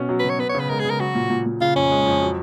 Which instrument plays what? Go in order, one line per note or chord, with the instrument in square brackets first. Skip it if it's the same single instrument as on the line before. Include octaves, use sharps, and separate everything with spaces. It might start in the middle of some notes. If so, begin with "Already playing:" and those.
Already playing: [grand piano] B2 C#4
F#3
[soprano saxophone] B4
[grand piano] B2
[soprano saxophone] C#5
[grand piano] B3 [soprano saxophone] B4
[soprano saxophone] C#5
[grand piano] C#3 [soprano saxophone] B4
[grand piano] G#3 [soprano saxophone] A#4
[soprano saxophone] G#4
[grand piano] C#3 [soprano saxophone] A#4
[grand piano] F#3 [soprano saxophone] F#4
[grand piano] A#2
A#2
A#2
[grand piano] C#3 [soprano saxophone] F4
[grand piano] F2 [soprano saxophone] C#4
[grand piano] G#3
F2
F#3